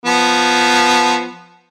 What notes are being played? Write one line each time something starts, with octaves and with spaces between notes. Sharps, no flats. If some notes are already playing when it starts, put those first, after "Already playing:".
F3 B3